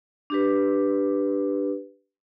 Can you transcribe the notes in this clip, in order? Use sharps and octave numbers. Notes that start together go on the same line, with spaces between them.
D4 G4 B4